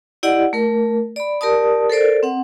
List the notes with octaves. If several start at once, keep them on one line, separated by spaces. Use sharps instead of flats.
E4 G4 D5 D#5 F#5
A3 A#4
D5 B5
G4 A#4 D5 A5 D#6
A4 A#4 C5 D5
C4 F#5